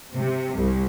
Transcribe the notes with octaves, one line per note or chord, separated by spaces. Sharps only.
C3
C2